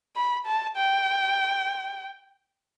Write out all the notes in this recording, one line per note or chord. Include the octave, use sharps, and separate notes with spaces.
B5
A5
G5